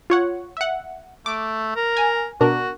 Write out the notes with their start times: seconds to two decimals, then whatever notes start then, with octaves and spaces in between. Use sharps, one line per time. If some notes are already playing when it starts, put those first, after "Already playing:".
0.10 F4 C#5 F#5
0.57 E5 F#5
1.26 A3 D6
1.76 A#4
1.97 G#5
2.41 B2 D4 F#4 A#4